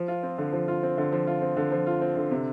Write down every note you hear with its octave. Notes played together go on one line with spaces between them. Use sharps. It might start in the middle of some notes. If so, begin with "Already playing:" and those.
Already playing: F3
F4
C4
D3
F3
F4
C4
D3
F3
F4
C4
D3
F3
F4
C4
D3
C3